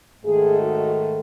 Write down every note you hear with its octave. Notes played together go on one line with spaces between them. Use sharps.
G#2 D#3 A3 G#4
F#4